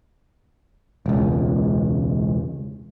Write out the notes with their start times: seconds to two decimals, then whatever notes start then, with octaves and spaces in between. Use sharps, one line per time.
1.06 E1 C#2